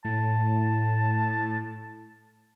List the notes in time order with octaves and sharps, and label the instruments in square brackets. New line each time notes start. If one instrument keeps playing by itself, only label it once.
[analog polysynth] A2 [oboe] A5